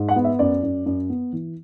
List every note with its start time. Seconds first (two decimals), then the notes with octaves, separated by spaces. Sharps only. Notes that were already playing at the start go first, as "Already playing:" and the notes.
Already playing: G#2
0.09 F#5
0.16 B3
0.24 E5
0.39 F#2 D5
0.63 F#2
0.86 F#2
1.10 B3
1.33 E3